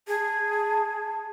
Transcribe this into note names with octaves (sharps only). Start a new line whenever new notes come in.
G#4 A5